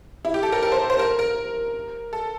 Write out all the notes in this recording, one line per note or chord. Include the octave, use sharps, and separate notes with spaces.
E4
G4
A4
A#4
A#4
C5
C5
A#4
A#4
A4